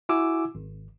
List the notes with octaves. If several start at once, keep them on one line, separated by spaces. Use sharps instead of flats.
E4 F#4 G#5 D6 E6
G#1